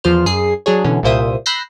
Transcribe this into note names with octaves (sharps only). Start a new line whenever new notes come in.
E2 F3 F4 C5 F6
F#2 G#4 C7
F#3 D4 G#4 C#5
B2 D3 E3 C#4
C2 A#2 A#3 C5 E5 D#6
B5 E6 F#6 G6 A#6 C7